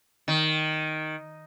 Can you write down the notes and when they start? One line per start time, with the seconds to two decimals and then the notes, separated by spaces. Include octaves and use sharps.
0.28 D#3